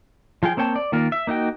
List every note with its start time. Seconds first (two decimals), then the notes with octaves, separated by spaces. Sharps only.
0.43 F3 F4 G#4 G5
0.57 A#3 C4 C#5 G5 A5
0.76 D5
0.92 D#3 A#3 F4 A#4
1.12 E5
1.27 A#3 D#4 F#4 G5